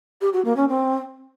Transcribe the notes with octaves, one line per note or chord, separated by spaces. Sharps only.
G4
F#4
A#3
C#4
C4